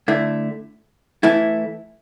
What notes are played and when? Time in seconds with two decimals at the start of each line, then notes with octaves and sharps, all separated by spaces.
0.08 D3 A3 E4
1.23 E3 A3 E4